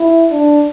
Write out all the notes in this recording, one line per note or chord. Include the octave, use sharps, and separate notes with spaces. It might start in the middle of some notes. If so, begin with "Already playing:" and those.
Already playing: E4
D4